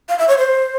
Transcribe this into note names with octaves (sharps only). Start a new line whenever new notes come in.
F5
E5
C#5
C5